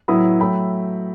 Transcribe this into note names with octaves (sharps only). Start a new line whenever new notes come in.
A2 F#3 B3 E4 B5 D#6
F#3 A3 E4 G5 B5